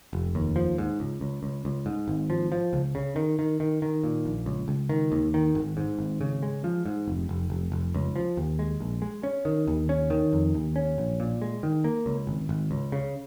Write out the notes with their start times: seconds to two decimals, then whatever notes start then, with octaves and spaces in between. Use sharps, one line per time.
0.13 F1
0.35 D#2
0.56 F3
0.78 G#2
1.00 C#2
1.21 C#2
1.43 C#2
1.65 C#2
1.86 G#2
2.08 G#1
2.30 F3
2.52 F3
2.73 C#2
2.95 C#3
3.16 D#3
3.39 D#3
3.60 D#3
3.82 D#3
4.04 A#2
4.25 A#1
4.46 C#2
4.68 C#2
4.89 D#3
5.12 D#2
5.34 D#3
5.55 G#1
5.77 G#2
5.99 G#1
6.21 C#3
6.43 G#3
6.64 F3
6.86 G#2
7.08 F1
7.29 F1
7.50 F1
7.72 F1
7.94 C#2
8.16 F3
8.37 D#2
8.59 G#3
8.80 A#1
9.02 G#3
9.23 C#4
9.45 D#3
9.67 D#2
9.89 C#4
10.10 D#3
10.33 F2
10.54 D#2
10.76 C#4
10.98 A#1
11.20 A#2
11.42 G#3
11.63 D#3
11.84 A#3
12.06 C#2
12.27 G#1
12.49 G#1
12.71 C#2
12.92 C#3